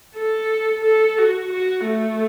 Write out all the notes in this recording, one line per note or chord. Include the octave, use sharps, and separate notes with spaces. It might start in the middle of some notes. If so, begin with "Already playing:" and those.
A4
A4
F#4
F#4
A3